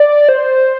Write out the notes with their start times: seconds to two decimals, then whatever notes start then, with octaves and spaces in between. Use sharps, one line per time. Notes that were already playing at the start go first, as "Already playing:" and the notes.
Already playing: D5
0.29 C5